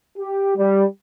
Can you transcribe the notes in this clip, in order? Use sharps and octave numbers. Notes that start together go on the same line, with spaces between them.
G4
G3